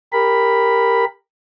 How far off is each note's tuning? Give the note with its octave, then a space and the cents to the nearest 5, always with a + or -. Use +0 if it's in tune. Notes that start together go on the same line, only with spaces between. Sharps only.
G4 +20 A#4 -5 B5 +0